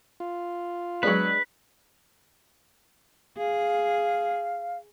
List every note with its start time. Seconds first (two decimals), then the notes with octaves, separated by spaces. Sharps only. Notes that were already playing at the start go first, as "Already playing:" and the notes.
0.20 F4
1.03 F#3 G#3 B3 D4 B4 F#6
3.37 G#4 F5